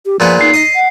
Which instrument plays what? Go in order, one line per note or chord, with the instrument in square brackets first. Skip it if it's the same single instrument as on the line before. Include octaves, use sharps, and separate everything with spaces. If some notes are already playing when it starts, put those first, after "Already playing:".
[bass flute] G4
[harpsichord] A#2 B3 G#4 [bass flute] F3
[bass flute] D#4 [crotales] C7
[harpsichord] D#5 D#6
[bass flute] F#5